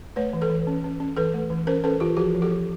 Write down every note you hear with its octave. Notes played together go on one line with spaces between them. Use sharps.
A3 B4 C#5
E3
A4 B4
E3
C#4
C#4
C#4
E3 A4 B4
A3
E3
C#4 A#4 C5
C#4 A4 B4
E3 F4 G4
F3 F#4 G#4
F3
G4 A4
F3